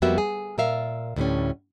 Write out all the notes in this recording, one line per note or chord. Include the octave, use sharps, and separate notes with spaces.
F2 G3 A#3 B3 F#4 E5
G#4
A#2 A#4 E5 F5
D2 A2 G3 C#4